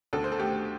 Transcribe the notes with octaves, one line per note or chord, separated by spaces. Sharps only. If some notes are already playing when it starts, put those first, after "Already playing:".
D2 A4
C5
A4
A3 G4